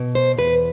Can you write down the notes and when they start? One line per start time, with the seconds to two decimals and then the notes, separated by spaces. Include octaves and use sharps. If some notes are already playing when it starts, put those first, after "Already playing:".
Already playing: B2
0.15 C5
0.37 E2 B4